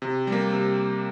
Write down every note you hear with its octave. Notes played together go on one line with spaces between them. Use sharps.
C3
G3
A#3
C3